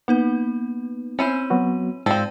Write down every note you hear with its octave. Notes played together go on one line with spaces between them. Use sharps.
A#3 B3 D#4 B4
C4 C#4 E4 C5 D#7
F#3 B3 F#4
G#2 F3 C4 D5 G5 E6